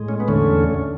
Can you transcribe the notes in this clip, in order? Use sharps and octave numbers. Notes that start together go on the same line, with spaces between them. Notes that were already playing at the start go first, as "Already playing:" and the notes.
Already playing: A2 G#3
C#4
B3
E2 D3 A3 C#4